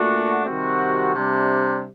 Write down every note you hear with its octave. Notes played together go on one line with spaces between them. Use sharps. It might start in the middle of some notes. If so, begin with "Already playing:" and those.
Already playing: A#2 A3 D4 F#4
C3 D#3 G3 C4 F#4
C3 G3 D4